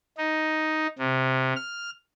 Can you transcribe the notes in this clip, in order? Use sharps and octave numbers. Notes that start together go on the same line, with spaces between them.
D#4
C3
F6